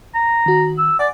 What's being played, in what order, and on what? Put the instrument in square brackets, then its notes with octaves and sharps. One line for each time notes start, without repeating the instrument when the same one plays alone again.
[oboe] A#5
[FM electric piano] D#3 F#4
[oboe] E6
[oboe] D5 [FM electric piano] F#5 G#5